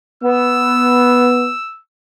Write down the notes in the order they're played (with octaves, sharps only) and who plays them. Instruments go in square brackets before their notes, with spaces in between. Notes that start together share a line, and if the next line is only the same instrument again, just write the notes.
[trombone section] B3 [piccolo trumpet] E6